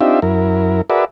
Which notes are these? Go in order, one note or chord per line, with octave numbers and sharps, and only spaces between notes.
C4 D4 D#4 F4 G4 E5
F#2 E4 A#4
F#4 G#4 A#4 B4 D5 E5